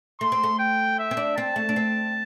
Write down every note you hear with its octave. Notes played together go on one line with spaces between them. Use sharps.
A3 C6
C4
A3
G5
E5
C4
D4
C4 A5
A3
D4
C4